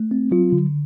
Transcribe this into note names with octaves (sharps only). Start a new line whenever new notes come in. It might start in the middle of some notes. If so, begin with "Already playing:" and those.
Already playing: A3
C4
F#3 F4
D3